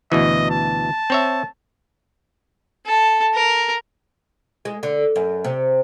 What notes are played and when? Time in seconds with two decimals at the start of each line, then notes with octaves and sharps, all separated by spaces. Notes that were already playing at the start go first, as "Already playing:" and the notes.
0.12 D2 B2 E3 D#5
0.50 A5
1.10 C4 C#5 E5
2.86 A4
3.35 A#4
4.65 G#3
4.83 D3
5.16 F#2
5.44 C3